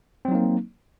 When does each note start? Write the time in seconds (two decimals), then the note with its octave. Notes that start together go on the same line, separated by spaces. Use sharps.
0.25 C4
0.28 F#3
0.32 D#4
0.35 A#3